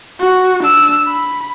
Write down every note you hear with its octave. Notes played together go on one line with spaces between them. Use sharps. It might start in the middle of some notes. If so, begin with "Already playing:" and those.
F#4
D4 E6
B5